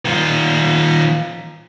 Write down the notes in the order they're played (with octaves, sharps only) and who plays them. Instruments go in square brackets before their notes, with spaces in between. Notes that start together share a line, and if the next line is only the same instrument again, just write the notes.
[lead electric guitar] D#3 F4